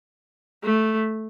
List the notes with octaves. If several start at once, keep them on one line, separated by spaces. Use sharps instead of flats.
A3